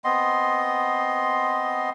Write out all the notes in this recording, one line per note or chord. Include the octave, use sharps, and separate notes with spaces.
B3 C4 D#5 C6